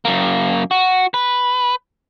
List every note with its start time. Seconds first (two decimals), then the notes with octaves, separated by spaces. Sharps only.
0.05 F#2 A#3
0.71 F#4
1.14 B4